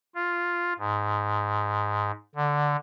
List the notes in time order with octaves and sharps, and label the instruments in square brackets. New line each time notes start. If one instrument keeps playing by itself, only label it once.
[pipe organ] F4
G#2
D3